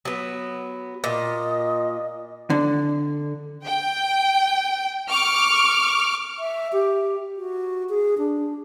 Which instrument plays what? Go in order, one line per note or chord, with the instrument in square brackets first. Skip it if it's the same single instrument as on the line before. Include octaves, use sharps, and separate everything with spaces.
[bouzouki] F#3 B3
[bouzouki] A#2 [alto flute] D#5
[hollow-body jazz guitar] D3
[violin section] G5
C#6 D6 F6
[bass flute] E5
G4
F#4
G#4
D4